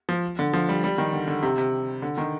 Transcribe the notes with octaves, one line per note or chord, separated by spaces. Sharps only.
F3
D3
F3
G3
G3
D#3
D3
D3
C3
C3
D3
D#3